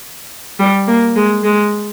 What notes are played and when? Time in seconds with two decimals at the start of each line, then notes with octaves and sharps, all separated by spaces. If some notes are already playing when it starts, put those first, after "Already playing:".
0.59 G3
0.87 A#3
1.16 G#3
1.44 G#3